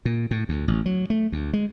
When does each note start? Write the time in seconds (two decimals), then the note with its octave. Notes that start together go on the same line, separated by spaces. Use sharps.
0.05 A#2
0.31 A2
0.49 D2
0.68 A1
0.86 F#3
1.10 A3
1.32 D2
1.53 G#3